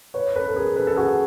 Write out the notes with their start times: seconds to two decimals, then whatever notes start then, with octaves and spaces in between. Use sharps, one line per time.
0.14 B4 C#5
0.36 A4 B4
0.48 A4
0.56 G#4 A#4
0.76 A4 B4
0.87 A4
0.97 F#4 G#4